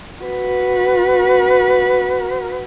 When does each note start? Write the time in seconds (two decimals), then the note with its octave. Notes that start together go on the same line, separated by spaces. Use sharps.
0.23 F#4 B4